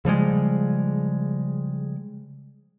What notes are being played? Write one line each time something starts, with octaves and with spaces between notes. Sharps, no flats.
C#3 F3 G3 G#3